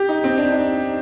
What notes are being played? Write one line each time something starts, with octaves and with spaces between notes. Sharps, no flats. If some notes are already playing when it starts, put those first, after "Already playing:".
Already playing: G4
D#4
C4
D4
D#4